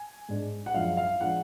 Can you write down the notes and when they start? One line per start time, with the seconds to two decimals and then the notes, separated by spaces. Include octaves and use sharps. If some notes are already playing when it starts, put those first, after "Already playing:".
Already playing: G#5
0.29 G#2 G#3 D4
0.66 F#5
0.74 F#2 F3 G#3 D4 F5
0.97 F5
1.21 F3 G#3 D4 F#5